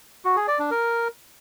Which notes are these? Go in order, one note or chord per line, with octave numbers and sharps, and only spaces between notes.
F#4
G#4
D5
D4
A#4